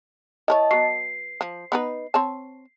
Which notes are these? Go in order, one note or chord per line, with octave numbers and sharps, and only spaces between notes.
E4 A#4 C#5 D#5 A5
F#3 B3 C7
F3
B3 D#4 B4
C4 C#5 A5